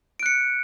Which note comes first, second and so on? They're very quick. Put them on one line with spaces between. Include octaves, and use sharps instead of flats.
D7 F#6 C#7